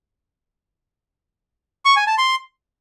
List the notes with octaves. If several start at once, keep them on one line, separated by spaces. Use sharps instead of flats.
C#6
G#5
A5
C6